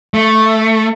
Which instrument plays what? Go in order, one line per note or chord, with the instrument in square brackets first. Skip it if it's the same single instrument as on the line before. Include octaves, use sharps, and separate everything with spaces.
[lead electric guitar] A3